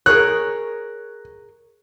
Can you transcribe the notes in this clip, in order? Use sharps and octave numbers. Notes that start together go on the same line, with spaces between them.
G#4 A#4 C#5 F#6